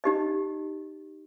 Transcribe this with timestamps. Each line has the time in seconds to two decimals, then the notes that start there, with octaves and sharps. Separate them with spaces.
0.04 D#4 G4 D#5